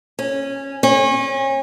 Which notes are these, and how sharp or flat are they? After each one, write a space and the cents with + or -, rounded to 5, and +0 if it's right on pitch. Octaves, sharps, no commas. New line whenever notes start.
C#4 -15
C#4 -35